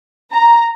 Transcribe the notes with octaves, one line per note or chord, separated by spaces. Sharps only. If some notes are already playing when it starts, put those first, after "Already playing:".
A#5